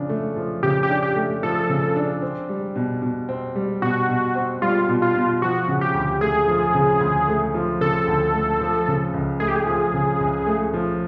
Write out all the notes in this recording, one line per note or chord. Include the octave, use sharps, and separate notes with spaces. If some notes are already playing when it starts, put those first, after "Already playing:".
Already playing: C#3 F3 D4
A3
F3
C#3 G4
G4
D4
G4
A3
F3 A4
C#3
D4
C4
G3
B2
B2
C4
G3
B2 F#4
B2
C4
G3 F4
B2
F4
B2
F3 F#4
C#3
G4
D2
A3 G#4
F3
C#3
D2
A3
F3
C#3 A4
D2
A3
F3
C#3
C#2
A3 G#4
G4
G#4
F3
C#3
C#2
A3
F3